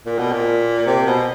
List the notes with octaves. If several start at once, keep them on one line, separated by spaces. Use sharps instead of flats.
A#2
B2
A#2
C3
B2